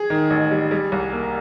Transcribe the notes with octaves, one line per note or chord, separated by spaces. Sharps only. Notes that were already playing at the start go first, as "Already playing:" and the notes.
Already playing: G#4
D#3
A1
G3
G3
C2
A#3